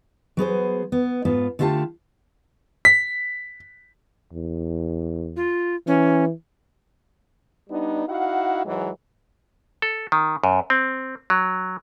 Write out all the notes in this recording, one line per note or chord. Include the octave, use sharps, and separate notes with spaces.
F#3 B3 G#4 C5
B3
G#2 B3 F4
D3 A3 F4 G4 A5
B6
E2
F4
E3 C#4
G3 B3 D4 D#4
D#4 E4 F#4 F5 F#5
G#2 E3 F#3 G#3
A4
D#3
F#2
C4
F#3